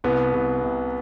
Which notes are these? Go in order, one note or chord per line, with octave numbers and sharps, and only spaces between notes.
C2 B3
C2
C3